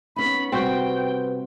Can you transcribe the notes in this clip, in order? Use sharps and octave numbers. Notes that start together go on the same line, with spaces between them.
B3 C#4 D#4 B5
C3 G3 B3 C4 F#4 B4 G5